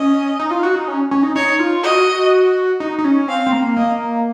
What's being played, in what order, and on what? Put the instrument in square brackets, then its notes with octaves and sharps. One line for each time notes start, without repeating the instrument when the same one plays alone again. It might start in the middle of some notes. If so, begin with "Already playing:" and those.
Already playing: [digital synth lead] C#4 [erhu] D#5
[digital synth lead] D#4
F4
F#4
D#4
C#4
C#4
D#4
[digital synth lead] D#4 [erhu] C#5
[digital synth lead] F4
[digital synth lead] F#4 [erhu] D#5
[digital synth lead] D#4
D#4
C#4
[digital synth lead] C4 [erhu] F5
[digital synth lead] C4
A#3
[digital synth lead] A#3 [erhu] D#5